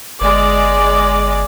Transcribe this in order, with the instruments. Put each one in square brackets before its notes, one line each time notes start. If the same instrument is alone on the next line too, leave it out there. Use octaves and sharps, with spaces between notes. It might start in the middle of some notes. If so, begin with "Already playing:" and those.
[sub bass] G1 [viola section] G#3 D5